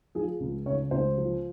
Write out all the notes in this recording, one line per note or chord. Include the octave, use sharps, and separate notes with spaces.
F3 G#4
C#2
C#3 C#5
C#2 C5
F3